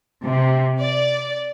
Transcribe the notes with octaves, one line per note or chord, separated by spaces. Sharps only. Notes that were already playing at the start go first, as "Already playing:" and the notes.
C3
D5